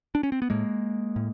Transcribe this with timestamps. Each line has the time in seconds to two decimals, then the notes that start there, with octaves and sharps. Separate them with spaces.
0.15 D4
0.23 C#4
0.32 C4
0.42 B3
0.50 A2 G#3 A#3
1.16 A2